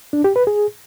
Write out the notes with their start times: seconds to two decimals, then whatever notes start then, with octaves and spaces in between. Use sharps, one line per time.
0.13 D4
0.24 G4
0.36 B4
0.47 G#4